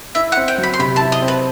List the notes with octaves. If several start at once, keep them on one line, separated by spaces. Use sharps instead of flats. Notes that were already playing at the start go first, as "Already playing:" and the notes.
E4 E5
F#5
C4
G5
F#3
B5
C6
C3 B5
A5
E4
D#5
C4
B4